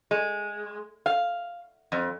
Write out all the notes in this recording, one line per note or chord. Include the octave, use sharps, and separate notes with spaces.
G#3
F5
F2